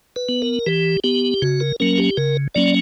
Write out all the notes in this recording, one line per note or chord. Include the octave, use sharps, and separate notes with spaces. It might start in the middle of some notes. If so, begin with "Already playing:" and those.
B4
B3
A#4
E3 G4
B3 G4
C#3 F#4
A#4
F#3 A#3 C#4 A#4
G4
C#3 A#4
F#3 A#3 C#4 D5